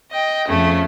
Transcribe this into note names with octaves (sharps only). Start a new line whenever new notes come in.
D#5 G5
F2 C#3 A3